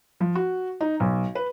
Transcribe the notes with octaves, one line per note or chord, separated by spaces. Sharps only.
F3
F#4
D#4
B1
B4